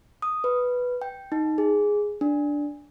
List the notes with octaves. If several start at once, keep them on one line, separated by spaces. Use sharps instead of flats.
D#6
B4
G5
D#4
G#4
D4